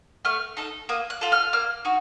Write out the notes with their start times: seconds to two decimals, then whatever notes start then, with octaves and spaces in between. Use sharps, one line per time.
0.25 A3 F6
0.57 D#4 A4
0.89 A#3 D#6
1.10 F#6
1.21 F4 A4
1.32 F6
1.53 A#3 F6
1.85 D#4 F#4